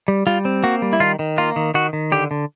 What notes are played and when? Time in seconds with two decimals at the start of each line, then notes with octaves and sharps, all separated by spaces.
0.08 G3
0.27 G3 F4
0.45 C4
0.64 A#3 F#4
0.82 G3
0.93 E4
1.00 D#3 F4
1.19 D#3
1.38 A#3 F4
1.56 D#3
1.74 D#3 F#4
1.93 D#3
2.12 D3 G4
2.31 D3